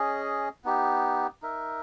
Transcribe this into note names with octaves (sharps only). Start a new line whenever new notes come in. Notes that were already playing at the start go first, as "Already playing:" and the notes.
Already playing: C#4 G#4 D#5
B3 D#4 G4
D#4 A#4 E5